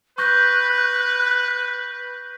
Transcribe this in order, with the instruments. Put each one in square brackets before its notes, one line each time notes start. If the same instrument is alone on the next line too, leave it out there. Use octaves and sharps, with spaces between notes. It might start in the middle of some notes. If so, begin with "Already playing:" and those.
[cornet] B4 [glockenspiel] C#6 G6 A#6 [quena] F#6